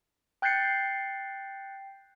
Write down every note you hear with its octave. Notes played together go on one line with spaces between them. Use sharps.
G5 F#6 G6 A6 C7 C#7